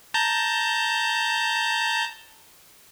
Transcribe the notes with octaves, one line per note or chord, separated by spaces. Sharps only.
A5 A#5 G6